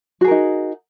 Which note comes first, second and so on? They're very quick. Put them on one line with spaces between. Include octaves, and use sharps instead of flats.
F#4 G#4 A#4 D#4